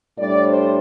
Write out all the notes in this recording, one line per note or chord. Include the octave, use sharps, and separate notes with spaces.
A2 G3 D4 D5
C5